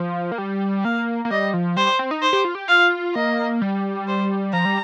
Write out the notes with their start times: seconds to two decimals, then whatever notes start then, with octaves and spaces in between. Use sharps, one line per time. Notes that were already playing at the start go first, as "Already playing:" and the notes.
Already playing: F3
0.32 A#3
0.38 G3
0.84 A#3 F5
1.25 A#3
1.31 G3 D#5
1.53 F3
1.77 G3 C5
1.99 C4
2.11 D#4
2.22 C5
2.33 G4
2.45 F4
2.55 G4
2.68 F4 F5
3.14 A#3 D#5
3.62 G3
4.07 C5
4.53 F3 A#5
4.65 G3